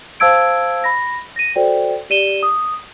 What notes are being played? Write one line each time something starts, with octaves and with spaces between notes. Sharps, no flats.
C5 F5 A5 E6 G#6 D7
B5 A#6
A#6 D#7
F#4 A4 C5 D5 G5
G4 D5 D#7 E7 G7
D#6